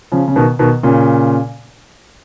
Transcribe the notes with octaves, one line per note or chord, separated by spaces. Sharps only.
C#3 F3
C#3
B2 D#3
B2 D#3
A#2 C#3